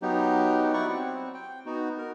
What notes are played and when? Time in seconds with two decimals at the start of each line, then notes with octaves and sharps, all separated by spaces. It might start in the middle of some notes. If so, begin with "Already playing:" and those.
0.02 F#3 B3 D#4 G4
0.74 E4 D5 F#5 C#6
0.89 C4
1.34 G5
1.66 B3 D#4 F#4
1.98 A#4